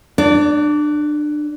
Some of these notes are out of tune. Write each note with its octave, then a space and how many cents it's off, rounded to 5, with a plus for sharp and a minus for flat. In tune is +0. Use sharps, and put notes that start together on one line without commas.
D4 +25 D5 -25